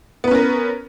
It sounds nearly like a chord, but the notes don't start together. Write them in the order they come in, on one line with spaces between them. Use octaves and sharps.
B3 B4 C#4 A#4